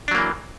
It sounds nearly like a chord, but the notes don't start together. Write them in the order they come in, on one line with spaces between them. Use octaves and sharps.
D4 F#3 A#3 E3